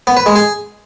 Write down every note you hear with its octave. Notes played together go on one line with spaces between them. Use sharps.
B3
B4
G#3
G#4